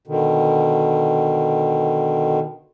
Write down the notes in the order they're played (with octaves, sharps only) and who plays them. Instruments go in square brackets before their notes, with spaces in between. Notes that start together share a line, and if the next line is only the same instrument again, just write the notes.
[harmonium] B2 D3 D#3